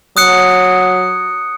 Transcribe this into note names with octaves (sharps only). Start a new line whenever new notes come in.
F#3 D#6 F#6 C#7